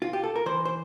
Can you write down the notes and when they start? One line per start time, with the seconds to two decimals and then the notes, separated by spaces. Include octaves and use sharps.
0.02 F4
0.13 G4
0.24 A4
0.36 A#4
0.46 E3 C5
0.65 C5